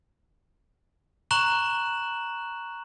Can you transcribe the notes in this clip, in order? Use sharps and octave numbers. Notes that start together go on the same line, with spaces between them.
A#5 C#6 F#6 E7 F#7